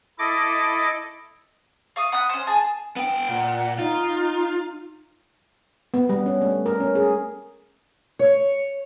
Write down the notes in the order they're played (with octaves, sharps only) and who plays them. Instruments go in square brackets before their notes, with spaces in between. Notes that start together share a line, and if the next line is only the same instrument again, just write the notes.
[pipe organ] E4 A4 D#5 D6
[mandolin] F5 C#6 D#6
F#5 B5 D#6 F#6
C#4 C5
G#4 G#5 A5
[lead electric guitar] B3 G5
[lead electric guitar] A#2 [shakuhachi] F#5
[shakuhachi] D#4 [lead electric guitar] F4
[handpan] B3
G3
C#4
A3
A#4
C#4
G#4
[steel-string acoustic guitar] C#5